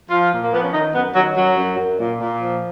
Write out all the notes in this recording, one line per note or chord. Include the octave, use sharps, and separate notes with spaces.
F3 F4
A#2
A#3
F3 B3
C#4
D#3 D#4
F#2 B3
D#3 F#3
F#2 F#3
F#2
F#2
A#2
A#2
F3